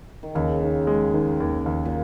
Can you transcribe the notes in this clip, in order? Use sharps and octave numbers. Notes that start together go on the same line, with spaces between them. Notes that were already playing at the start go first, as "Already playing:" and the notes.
D#3
D#2 C#3
D#3
G#3
D#3
D#2
D#2
A#2